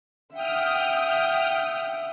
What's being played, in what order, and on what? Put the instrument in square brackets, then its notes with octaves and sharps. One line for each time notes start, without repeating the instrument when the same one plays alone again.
[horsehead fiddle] E5 F#5 [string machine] G5 D#6 F6